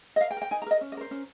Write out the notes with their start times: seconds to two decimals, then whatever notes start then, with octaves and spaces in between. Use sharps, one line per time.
0.16 D#5
0.21 A#4 F5
0.31 G5
0.37 A#4
0.42 G5
0.51 D#4 G#5
0.62 A#5
0.66 A#4 D#5
0.81 C#4
0.92 D#5
0.97 A#4 C5
1.11 C#4